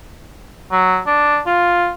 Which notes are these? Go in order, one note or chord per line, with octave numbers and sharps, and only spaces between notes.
F#3
D4
F4